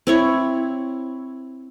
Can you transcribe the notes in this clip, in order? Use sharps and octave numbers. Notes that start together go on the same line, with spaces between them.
C4 E4 C#5